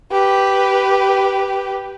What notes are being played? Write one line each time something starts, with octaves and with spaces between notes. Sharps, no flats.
G4 B4